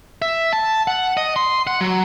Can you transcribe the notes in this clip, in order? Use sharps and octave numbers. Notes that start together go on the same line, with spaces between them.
E5
A5
F#5
D#5
C6
F#5
F#3